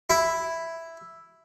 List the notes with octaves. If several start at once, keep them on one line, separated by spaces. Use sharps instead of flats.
E4